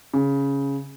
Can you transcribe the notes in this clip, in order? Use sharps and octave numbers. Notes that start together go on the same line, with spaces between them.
C#3